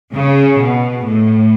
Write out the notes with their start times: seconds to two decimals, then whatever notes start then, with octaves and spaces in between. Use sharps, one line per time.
0.13 C#3
0.59 B2
1.05 A2